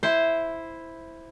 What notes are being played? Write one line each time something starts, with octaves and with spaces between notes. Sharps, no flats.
E4 C5